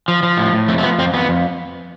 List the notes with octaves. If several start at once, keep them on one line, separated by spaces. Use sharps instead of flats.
F3
F3
A2
A2
F2 A3
A3
F3 B3
F2 C4
F2 B3
F2